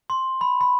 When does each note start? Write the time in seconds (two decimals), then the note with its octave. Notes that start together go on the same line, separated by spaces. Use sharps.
0.10 C6
0.41 B5
0.61 B5